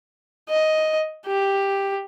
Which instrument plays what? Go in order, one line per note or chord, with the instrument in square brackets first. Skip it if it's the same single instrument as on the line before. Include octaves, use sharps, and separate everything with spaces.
[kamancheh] D#5
G4